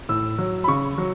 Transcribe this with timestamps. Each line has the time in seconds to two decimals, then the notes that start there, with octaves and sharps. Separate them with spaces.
0.09 A2 E6
0.38 F#3
0.64 B5
0.68 C#3 C#6
0.98 F#3